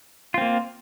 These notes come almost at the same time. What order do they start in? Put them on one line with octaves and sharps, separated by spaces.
F4 C4 A#3